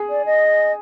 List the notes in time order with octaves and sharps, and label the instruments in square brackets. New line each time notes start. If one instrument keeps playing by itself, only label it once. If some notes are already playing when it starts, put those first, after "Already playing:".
Already playing: [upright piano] G#4
[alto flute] D5
D#5